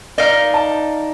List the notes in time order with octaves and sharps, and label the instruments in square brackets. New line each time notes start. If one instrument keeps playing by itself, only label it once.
[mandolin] D#4 A#4 F5 [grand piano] D5
[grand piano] A5